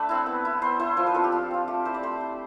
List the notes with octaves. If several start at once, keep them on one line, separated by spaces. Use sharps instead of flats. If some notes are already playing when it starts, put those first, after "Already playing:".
Already playing: A3 D4 B4 D5 E5
C4 E4
B3
E4
B3 C5
E4 C5
F3 C5
B4
C4 F4 A4
G4
F3 F4
C4 F4
A3 G4
E4 C5
D5
A3 C5
E4